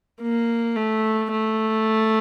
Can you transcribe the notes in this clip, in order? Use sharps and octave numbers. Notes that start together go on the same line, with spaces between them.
A#3
A3
A3